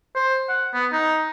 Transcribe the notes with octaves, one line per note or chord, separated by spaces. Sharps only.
C5
F#5
B3
D#4